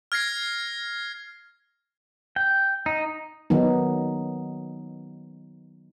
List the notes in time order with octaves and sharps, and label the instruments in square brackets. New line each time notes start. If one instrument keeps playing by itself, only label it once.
[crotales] F6 G#6 A#6 C7
[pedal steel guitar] G5
D#4
[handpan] D#3 F#3 B3 D#4